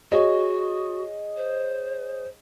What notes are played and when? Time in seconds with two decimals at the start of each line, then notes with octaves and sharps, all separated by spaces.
0.12 F#4 G#4 C#5 D#5
1.37 C5